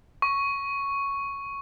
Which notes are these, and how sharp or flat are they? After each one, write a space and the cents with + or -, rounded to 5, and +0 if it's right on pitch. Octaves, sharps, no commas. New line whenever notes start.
C#6 +0